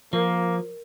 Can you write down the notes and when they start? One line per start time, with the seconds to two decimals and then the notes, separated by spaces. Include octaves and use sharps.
0.13 F3 A#3 A#4